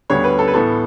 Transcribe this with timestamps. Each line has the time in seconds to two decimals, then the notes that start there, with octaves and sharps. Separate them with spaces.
0.10 D2 D3 G3 B3 C#5
0.24 B4
0.39 A4
0.48 B4
0.54 A2 E3 B3 A4